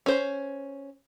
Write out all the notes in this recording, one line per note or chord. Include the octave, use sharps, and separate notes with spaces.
C#4 C5